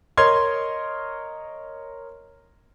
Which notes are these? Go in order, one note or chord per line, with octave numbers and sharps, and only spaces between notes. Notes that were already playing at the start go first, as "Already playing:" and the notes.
A#4 C#5 D#5 C6 F6 G#6